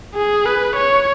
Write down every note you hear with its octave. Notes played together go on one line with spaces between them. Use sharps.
G#4
B4
C#5